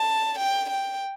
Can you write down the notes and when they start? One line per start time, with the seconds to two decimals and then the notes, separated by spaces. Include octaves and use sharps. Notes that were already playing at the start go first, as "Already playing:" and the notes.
Already playing: A5
0.39 G5
0.70 G5